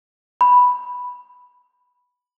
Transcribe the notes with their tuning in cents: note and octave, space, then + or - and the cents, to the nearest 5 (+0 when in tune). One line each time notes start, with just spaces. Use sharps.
B5 +0